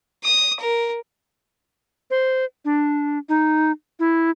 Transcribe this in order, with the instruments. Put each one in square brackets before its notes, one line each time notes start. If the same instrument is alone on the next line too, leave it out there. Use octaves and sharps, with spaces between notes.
[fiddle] D#6
A#4
[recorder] C5
D4
D#4
E4